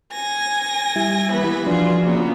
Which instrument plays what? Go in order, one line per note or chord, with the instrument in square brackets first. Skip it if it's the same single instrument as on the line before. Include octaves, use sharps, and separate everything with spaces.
[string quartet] G#5 A#6
[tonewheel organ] G3 E4
[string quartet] E3 B3 B4
[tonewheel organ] F3 D4 [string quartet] F4 F#4 G#4
[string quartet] C#3 A#3 B3